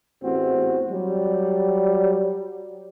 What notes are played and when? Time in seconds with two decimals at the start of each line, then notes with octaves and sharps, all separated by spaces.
0.23 A1 E2 C4 F#4
0.90 F#3 G3